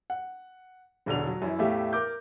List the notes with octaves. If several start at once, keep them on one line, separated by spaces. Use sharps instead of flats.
F#5
E1 B1 D3 F7
F#3
F#2 E3 E4
E2 A2 A3 G4 E5 F5
A#4 D6 G6